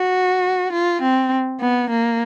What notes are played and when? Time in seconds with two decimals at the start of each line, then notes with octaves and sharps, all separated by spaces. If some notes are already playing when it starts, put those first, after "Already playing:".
Already playing: F#4
0.72 F4
1.02 C4
1.60 B3
1.90 A#3